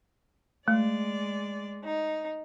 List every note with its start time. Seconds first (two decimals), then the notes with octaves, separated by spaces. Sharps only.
0.68 G#3 A3 D5
1.84 D#4